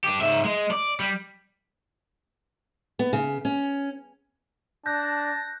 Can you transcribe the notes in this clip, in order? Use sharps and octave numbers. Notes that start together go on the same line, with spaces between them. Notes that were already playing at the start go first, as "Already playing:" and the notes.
D4 G4
G#2 E5
G#3
D5
G3
B3
C#3
C#4
D4 A5 F#6 G6 A#6